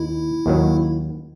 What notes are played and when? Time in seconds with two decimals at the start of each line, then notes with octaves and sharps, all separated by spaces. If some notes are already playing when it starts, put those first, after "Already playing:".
Already playing: D#2 D#3 E4
0.46 D#2 D#3 F#3